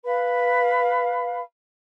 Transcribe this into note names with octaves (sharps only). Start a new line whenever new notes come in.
B4 F5 B5